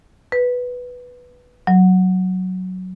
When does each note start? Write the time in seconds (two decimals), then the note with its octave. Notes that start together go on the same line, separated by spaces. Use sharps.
0.32 B4
1.67 F#3